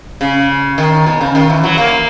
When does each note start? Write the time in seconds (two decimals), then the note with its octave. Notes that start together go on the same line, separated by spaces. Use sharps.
0.21 C#3
0.78 D#3
1.06 B2
1.21 C#3
1.35 D#3
1.50 E3
1.64 F#3
1.78 A#3